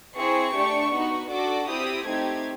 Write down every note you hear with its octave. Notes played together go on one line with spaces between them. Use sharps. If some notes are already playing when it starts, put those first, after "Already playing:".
C4 E4 G#4 C#6
A3 D4 G4
B3 D#4 F#4
D4 F#4 A4 D6
C4 E4 G4 D#6
A3 C4 D#4 G4 G#6